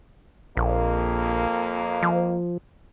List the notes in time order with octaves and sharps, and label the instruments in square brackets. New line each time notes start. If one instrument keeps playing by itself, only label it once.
[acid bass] A#1 [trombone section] F2 A#3
[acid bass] F3